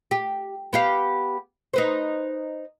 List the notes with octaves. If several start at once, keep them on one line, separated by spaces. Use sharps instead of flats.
G4
B3 G4 F5
D#4 B4 C5